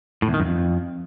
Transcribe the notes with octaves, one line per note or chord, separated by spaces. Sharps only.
A2
E2
D#3
F#2
F2